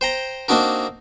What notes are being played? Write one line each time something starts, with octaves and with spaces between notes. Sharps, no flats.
C5 G5 A#5
A#3 C4 D4 D#4 F#4 A#4